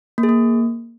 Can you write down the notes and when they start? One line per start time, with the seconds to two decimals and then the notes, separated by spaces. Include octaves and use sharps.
0.18 A#3
0.23 G#4
0.29 A#3